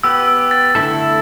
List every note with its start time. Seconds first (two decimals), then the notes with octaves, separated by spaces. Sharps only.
0.03 B3 G4 B4 E6
0.28 E6
0.51 A6
0.75 D3 A3 E4 A4 E6